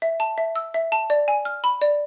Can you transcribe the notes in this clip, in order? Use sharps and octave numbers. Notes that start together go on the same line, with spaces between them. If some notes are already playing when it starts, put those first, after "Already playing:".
E5
A5
E5
E6
E5
A5
D5
G#5
F6
B5
D5